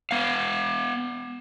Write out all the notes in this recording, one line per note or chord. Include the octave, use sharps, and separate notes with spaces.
B3 F5